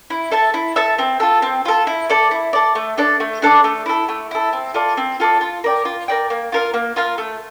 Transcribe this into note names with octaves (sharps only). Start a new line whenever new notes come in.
E4
A4 E5 A5
E4
A4 E5 A5
C4
F4 A4
C4
F4 A4
E4
A4 D5
E4
A4 D5
A3
D4 A4 D5
A3
D4 A4 D5
A3
E4 A4
A3
E4 A4
C4
F4 A4 D5
C4
F4 A4 D5
F4
A#4 D5 G5
F4
A#4 D5 G5
A#3
F4 A#4 F5
A#3
F4 A#4 F5
A3